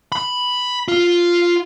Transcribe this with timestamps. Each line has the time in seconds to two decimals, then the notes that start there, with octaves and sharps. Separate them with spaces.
0.12 B5
0.88 F4